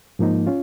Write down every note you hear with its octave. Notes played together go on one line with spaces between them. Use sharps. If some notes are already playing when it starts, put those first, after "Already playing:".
G#2 F3 A#3 D#4
C#4 F4